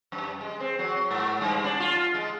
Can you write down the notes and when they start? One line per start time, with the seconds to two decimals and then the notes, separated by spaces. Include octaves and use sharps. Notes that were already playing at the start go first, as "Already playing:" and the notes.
0.12 F#2
0.41 G#3
0.60 C4
0.79 F#3
1.11 G#2
1.41 G2
1.64 D4
1.80 F4
2.14 G#3